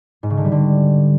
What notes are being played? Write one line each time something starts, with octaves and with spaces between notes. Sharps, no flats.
G#2
C#3
D3
G3
D3